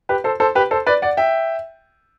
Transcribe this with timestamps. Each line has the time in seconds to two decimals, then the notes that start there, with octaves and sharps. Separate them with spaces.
0.09 G4 B4
0.24 A4 C5
0.40 A4 C5
0.55 G4 B4
0.71 A4 C5
0.87 B4 D5
1.02 D5 F#5
1.17 E5 G5